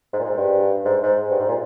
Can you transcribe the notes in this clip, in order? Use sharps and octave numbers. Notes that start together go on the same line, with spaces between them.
G#2
A#2
G#2
G2
G#2
G#2
G2
G#2
A#2